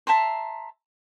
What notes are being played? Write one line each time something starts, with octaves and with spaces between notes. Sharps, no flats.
E5 A5 A#5 C6